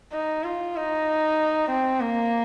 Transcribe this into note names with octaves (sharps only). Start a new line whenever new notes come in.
D#4
F4
D#4
C4
A#3